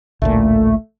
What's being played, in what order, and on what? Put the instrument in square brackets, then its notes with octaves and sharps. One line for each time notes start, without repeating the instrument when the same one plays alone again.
[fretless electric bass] A1 D2 A#2 [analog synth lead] A3